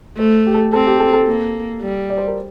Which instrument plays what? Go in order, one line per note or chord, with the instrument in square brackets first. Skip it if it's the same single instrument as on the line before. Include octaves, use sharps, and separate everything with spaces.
[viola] A3 [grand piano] C5
[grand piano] G4
A4
[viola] C4 [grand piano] A4
[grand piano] G4
A4
A4
[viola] A#3
G3
[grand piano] D5
C5
A#4